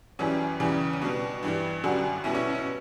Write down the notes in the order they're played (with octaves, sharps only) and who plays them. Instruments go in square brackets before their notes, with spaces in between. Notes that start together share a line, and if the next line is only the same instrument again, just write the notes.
[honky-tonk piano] F#2 E3 G3 C#4
E2 C#3 E3 G3
C#4
B2 G3 D4
G2 E3 G3
F#2 D3 G3 D4 F#4
B2 G3 C#4 E4
C#4 E4
C#4